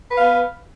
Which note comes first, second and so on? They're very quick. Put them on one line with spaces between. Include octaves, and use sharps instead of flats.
B4 F5 B3